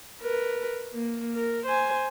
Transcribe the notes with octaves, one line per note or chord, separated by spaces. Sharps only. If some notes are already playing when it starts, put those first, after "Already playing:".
A#4 B4
A#3
A#4
C5 G#5